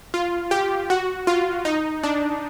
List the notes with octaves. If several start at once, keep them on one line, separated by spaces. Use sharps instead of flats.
F4
G4
F#4
F4
D#4
D4